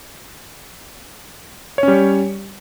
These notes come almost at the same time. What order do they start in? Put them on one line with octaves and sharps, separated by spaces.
C#5 C#4 G3